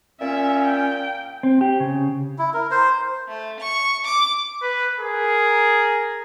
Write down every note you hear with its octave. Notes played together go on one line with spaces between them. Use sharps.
A#2 C#4 E5
G5
C4
G4
C#3
E4
A#4
C5
A3
C#6
D6
B4
G#4 A#4